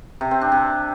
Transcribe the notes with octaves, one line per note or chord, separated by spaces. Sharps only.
C3
C4
D4
C3